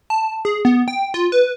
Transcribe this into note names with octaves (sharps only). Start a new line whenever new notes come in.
A5
G#4
B3
G5
F4
B4